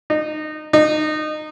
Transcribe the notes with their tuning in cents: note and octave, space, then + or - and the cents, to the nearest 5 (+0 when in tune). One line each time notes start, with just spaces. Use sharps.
D#4 -25
D#4 -25